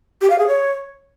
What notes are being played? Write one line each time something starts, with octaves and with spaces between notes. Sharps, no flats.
G4
F5
G#4
C#5